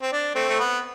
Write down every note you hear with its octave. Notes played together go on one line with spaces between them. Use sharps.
C4
D4
A3 C4
A3
B3